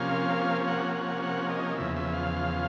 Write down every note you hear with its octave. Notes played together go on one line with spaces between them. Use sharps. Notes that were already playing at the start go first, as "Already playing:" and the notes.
Already playing: C3 F3 A#3 C#4 F5
F#5
F#5
F#5
D#5
E2 C#3 F3 E5
E5
F5